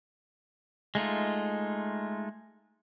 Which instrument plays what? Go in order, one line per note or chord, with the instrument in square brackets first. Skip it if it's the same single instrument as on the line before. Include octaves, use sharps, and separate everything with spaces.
[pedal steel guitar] G#3 A3 D#4 F4